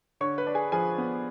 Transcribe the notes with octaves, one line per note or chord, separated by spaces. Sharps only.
D3 C#5 C#6
B4 B5
D4
G#4 G#5
F3 G#4 G#5
B3